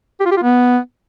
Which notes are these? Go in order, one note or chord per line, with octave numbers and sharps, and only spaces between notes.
G4
F4
G4
F4
B3